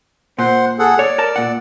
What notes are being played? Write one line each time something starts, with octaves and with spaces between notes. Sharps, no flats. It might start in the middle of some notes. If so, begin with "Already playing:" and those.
A#2 C5 F#5 C6
G#4 A4 F#5
C#5 D5
A#4 A5
A#2 F#5